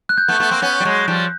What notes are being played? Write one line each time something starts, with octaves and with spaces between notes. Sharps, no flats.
F#6
G6
A3 B3
A3 B3
A#3 C4
B3 C#4
G3
F#3 G#3
F3 G3